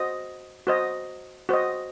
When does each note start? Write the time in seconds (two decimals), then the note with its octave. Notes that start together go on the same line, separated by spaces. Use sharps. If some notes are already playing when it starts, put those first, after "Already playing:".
Already playing: F#4 C5 D#5
0.67 F#4 C5 D#5
1.49 F#4 C5 D#5